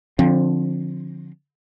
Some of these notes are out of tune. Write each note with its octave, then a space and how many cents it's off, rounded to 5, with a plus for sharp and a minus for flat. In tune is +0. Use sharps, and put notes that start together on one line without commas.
D3 +0 F3 +10 C4 +25